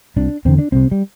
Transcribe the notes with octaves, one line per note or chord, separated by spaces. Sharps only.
C2 C3 D4
E2 D3 C4
D4
C2 C3 C4
G3